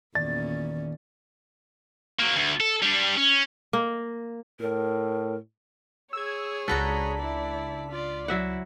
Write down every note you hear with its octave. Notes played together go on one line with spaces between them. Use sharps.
E2 A#2 D#3 C#4 D5 A6
F#3 A#3
D2
A4
G3 D4
C#4
A#3
A2 A#4
G#4 C#5 E6 G#6
C#2 D4 F#4 A4 B4 A#5 B6
E4 D5
F4 D5
F#3 E4 E5 F#5